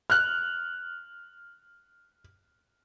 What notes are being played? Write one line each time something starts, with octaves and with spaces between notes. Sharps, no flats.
F6 F#6